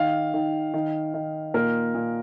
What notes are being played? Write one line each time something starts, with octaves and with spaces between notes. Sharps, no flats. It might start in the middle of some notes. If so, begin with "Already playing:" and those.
Already playing: D#3 F5
D#3
D#3
D#3
A#2 A#4
A#2